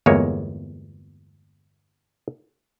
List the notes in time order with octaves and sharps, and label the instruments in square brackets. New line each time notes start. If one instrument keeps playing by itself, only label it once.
[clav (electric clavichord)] G1 E2 G#3 A#3 C#5